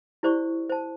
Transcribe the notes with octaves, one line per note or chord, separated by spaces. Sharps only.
E4 G4 C5 D5 C#6
C5 A5